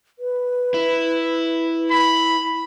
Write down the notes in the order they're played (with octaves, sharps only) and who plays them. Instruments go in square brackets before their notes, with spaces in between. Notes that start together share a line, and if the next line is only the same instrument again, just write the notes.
[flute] B4
[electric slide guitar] E4
[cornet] B5